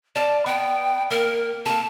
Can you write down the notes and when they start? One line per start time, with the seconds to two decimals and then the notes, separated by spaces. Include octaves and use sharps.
0.16 D5 F5 A5
0.46 B3 G5
1.11 A#3 A#4
1.66 A#3 A4 A5